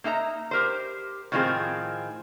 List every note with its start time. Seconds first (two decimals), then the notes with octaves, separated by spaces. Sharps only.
0.04 A#3 D#4 E5 A#5
0.51 G4 A#4 C5
1.32 A2 D#3 F3 G3 C4 G#4